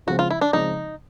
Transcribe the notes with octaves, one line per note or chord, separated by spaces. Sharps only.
C#3 F3 G#3 C4 F#4
F4
E4
D4
C#3 F3 G#3 C4 D#4